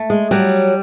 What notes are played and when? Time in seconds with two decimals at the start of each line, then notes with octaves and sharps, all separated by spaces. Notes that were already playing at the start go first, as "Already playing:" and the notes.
Already playing: A3
0.10 G#3
0.31 F#3 G3